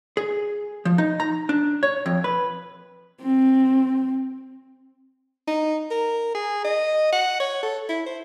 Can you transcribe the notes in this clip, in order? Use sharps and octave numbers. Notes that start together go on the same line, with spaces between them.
G#4
F3
D#4
A#5
D4
C#5
F2
B4
C4
D#4
A#4
G#4
D#5
F#5
C#5
A4
E4
C5